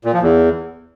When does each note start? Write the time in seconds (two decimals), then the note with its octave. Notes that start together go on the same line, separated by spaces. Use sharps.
0.05 A#2
0.14 F3
0.23 E2